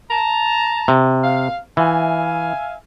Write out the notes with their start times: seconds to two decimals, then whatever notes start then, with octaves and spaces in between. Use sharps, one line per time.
0.10 A5 A#5
0.88 C3
1.24 F5
1.77 E3 E5 F5 G#5